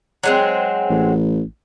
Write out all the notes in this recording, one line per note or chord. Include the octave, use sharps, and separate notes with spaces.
F#3 G#3 C4
A1